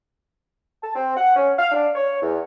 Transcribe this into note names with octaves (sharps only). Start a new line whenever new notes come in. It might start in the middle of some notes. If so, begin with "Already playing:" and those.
A5
C4
F#5
C#4
F5
D4
C#5
E2